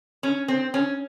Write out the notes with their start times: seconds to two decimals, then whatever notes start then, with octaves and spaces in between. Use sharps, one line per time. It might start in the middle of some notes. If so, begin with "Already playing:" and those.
0.23 C#4
0.48 C4
0.74 C#4